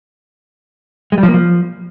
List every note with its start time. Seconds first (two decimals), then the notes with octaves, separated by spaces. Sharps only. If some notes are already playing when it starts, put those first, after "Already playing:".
1.12 G#3
1.18 G3
1.23 F3
1.29 A#3
1.34 F3